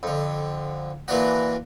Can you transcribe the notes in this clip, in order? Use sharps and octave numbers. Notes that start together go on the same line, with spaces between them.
F2 D3
A#2 E3 D4 F#4